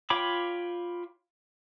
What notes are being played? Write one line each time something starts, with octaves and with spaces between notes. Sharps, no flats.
F4 C#5 G5 B5 D6